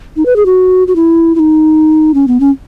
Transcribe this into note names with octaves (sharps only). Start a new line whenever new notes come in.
D#4
B4
G#4
F#4
F#4
E4
E4
D#4
C#4
B3
C#4